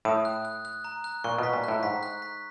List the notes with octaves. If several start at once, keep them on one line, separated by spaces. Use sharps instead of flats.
A2 D#6
F#6
F#6
F#6
A#5
F#6
A#2 C#6
B2 B6
A#2
A2 F#6
G#2 B6
F#6
B6